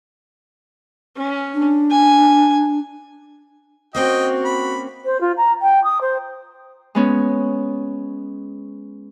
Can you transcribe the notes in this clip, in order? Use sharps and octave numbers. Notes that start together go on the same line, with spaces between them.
C#4
D4
G#5
A#3 C4 C#4 F#4 D#5 G5
B5
C5
F4
A#5
G5
D#6
C5
G#3 B3 C#4